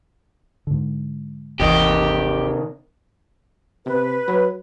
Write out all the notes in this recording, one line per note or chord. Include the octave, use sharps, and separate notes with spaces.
G#2 D3
G1 D#2 C3 D#3 E3 G4 D#5
C3 B4
F#3